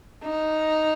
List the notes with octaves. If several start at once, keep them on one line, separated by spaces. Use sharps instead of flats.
D#4